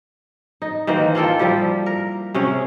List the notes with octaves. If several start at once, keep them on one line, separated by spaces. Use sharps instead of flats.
D#4
D#3 E3 A#3 C5
A#3 F4 A4 G5
F3 G3 E4 G4
A#4
C3 C#4 G#4 C#5